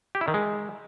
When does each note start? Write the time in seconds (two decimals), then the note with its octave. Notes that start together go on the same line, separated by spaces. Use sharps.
0.15 G4
0.21 E4
0.28 D#3
0.34 G#3